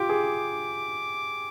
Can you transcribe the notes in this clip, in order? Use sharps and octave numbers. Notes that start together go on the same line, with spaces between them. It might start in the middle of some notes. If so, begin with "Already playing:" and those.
Already playing: F4 G4 D6
G#4